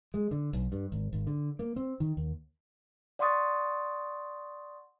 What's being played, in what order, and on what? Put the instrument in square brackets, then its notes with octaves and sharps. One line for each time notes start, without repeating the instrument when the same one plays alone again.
[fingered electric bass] G#3
D3
B1
G2
G#1
G#1
D3
A#3
C4
D#3
D#2
[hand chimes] D5 F#5 C6 C#6 D#6 A6